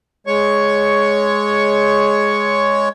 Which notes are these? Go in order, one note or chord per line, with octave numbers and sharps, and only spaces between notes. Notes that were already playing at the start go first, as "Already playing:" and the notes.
G#3 C#5 C#6